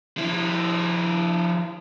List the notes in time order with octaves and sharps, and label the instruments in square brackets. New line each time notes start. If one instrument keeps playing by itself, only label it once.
[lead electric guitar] F3 E4